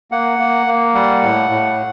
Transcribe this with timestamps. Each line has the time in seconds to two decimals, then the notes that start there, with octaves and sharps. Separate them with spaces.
0.12 A#3 F#5
0.39 A#3
0.67 A#3
0.94 G3 F#5
1.22 A2
1.50 A2